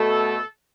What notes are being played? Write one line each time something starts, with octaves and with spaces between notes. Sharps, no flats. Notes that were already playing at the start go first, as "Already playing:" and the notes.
Already playing: B2 A3 A4